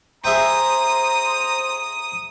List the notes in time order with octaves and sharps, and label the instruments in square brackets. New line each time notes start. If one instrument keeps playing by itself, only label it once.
[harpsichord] G#4 E5 G5 [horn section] C5 A#5 [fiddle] D#6